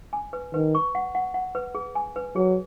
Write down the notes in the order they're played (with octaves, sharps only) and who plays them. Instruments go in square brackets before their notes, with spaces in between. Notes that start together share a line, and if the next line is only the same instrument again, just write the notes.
[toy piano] G#5
B4
[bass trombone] D#3 [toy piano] B4
[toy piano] C#6
F#5
F#5
F#5
B4
G#4
G#5
B4
[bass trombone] F#3 [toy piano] G#4